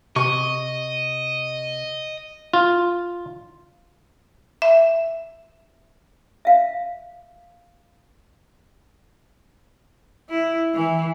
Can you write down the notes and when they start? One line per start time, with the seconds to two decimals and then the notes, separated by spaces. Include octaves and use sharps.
0.16 C3 D#5 C#6
2.54 F4
4.62 E5
6.45 E5 F5
10.30 E4
10.74 E3